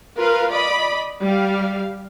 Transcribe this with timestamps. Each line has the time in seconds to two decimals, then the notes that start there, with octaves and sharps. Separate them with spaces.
0.18 F4 A#4 B4 F5
0.53 D5 D#5 B5
1.22 G3 F5